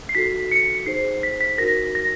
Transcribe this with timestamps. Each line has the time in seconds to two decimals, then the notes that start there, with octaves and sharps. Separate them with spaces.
0.09 C7
0.15 D#4 F#4 A4 B6
0.52 C#7
0.86 D#4 G#4 C5 C7
1.23 B6
1.41 B6
1.58 D#4 F#4 A#4 A#6
1.95 A#6